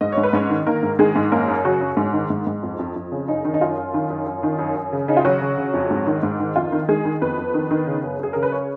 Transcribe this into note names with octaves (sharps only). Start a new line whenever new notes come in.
G#2 D#5
C#5
G#2
B4
G#2 C#4 C#5
D#3
D#3 A#3 A#4
G#2
D#3 G#3 G#4
G#2
F#2 A#3 A#4
F#2
C#3 F#3 F#4
F#2
G#2
D#3
G#2
G#2
F2
F2
F2
C#3
F#2 D#4
D#3
D#4
F#2 F4
F#2
D#3
F#2
F#2
D#3
F#2
F#2
C#3
C#3 D#4
F4
C#3 F#3 F#4
C#3
C#3
F2
G#2
D#3
G#2
D#3
F2 F4
D#3
D#3 G#3 G#4
D#3
F2 B3 B4
F2
D#3
D#3
C#3
F#2
F#2 G#4
C#3 A#4
B4
C#4 C#5